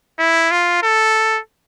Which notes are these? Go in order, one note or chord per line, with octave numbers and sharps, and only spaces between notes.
E4
F4
A4